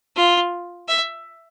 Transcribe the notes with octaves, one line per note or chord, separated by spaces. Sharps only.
F4
E5